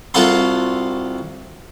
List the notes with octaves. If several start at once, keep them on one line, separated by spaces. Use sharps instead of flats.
C2 F4 F#4 A4 C6